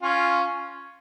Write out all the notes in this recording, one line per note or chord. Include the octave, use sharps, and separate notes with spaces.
C#4 F4